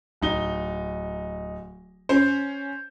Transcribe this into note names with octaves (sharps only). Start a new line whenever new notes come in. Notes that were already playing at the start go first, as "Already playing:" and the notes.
D1 D#4 G7
C#4 C5